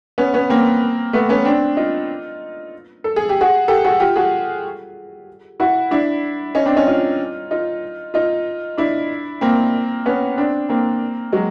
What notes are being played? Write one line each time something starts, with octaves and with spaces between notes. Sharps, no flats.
B3 C#4
B3 C#4
A#3 C4
A3 B3
B3 C#4
C4 D4
D#4 F4
A4
G#4
G4
F#4 G#4
G4 A4
F#4 G#4
F4 G4
F#4 G#4
E4 F#4
D4 E4
C#4 D#4
C4 D4
C#4 D#4
D#4 F4
D#4 F4
D#4 F4
D4 E4
A#3 C4
B3 C#4
C4 D4
A#3 C4
F#3 G#3